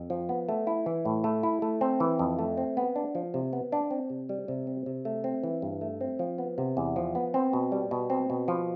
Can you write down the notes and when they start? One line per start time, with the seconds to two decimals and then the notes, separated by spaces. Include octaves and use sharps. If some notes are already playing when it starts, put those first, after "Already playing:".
Already playing: F2
0.10 F3
0.29 B3
0.49 A3
0.67 E4
0.86 E3
1.05 A2
1.24 A3
1.43 E4
1.62 A3
1.81 C4
2.00 E3
2.19 F2
2.39 A3
2.58 C4
2.77 B3
2.96 D4
3.15 F3
3.34 C3
3.53 B3
3.72 D4
3.91 C4
4.10 C3
4.29 G3
4.48 C3
4.67 C4
4.86 C3
5.05 A3
5.24 C4
5.43 E3
5.62 G2
5.81 A3
6.01 C4
6.19 F3
6.38 B3
6.58 C3
6.77 E2
6.96 F3
7.15 B3
7.34 C4
7.53 B2
7.72 G3
7.91 B2
8.10 C4
8.30 B2
8.48 F3